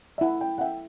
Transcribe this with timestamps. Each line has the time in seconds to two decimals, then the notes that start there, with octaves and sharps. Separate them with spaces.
0.18 E5
0.21 E4 F#5
0.41 G5
0.58 F#5
0.61 E5 G5